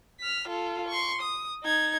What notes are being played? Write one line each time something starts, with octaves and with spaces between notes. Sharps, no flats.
F6 B6
F4 A4
C6 C#6
D#6
D#4 G#6